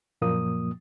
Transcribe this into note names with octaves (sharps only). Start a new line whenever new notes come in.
F#2 A#2 F3 A#3 D#6